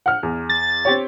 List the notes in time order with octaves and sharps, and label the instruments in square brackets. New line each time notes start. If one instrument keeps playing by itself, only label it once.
[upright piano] F#5 F6
E2
[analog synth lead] A6
[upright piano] C4 G4 C#5